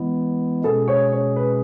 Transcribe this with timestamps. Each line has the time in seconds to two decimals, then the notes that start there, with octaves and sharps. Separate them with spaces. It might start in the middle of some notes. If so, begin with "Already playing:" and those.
Already playing: E3 G#3 B3 E4
0.64 B2 G#3 C#4 G#4 A4
0.88 C#5
1.12 C#5
1.36 B4